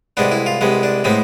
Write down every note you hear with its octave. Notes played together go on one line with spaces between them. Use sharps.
C2 C3 G#3 B3 D4
E4
F4
C2 C3 G#3 B3
D4
A2 G#3 B3 C4